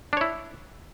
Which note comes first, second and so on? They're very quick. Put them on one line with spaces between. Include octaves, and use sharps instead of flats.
D4 C#5 E4